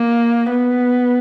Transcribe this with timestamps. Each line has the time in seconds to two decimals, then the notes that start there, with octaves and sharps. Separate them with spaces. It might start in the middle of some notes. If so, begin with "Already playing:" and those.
Already playing: A#3
0.50 B3